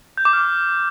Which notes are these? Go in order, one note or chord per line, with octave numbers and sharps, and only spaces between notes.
G6
D6
F6